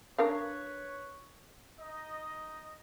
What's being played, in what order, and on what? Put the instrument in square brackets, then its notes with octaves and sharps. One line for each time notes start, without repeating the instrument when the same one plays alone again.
[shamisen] D4 A#4 F5 [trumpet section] B4 C#5
[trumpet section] D#4 D#5